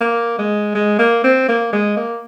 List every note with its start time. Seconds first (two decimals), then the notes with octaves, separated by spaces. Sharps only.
0.01 A#3
0.39 G#3
0.75 G#3
0.99 A#3
1.24 C4
1.49 A#3
1.73 G#3
1.97 A#3